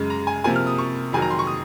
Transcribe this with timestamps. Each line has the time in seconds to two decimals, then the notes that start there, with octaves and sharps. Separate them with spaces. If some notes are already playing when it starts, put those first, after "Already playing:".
Already playing: F#2 C#3 G#3
0.10 A#5
0.27 G#5
0.44 C3 F3 A#3 G#5
0.56 F6
0.67 D#6
0.78 C#6
1.13 F2 D#3 F#3 G#5
1.22 A#5
1.31 C6
1.39 C#6
1.47 D#6